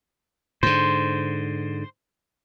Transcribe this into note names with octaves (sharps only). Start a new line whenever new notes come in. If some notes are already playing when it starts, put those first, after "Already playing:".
G#2 D3 C5